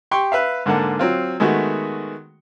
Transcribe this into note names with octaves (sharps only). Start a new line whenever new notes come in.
G4 G5 C6 C#6
B4 E5 F5
G#2 D3 A#3 F#5 A5
F#3 C4 F4
D#3 G#3 A3 B3 F#4